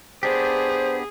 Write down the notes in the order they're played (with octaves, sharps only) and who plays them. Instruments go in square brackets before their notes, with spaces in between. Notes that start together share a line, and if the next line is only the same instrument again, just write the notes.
[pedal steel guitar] B3 D4 G4 [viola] G#4 [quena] C5